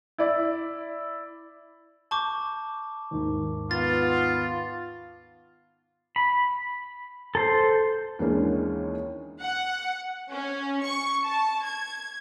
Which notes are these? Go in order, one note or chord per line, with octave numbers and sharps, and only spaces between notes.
E4 D5
A5 C#6 D6 G6
D#2 G#2 D#3
B3 F4 A6
B5
A4 C5
D#2 E3 G#3 A#3 C#4 D4
F#5
C#4
C#6
A5
G#6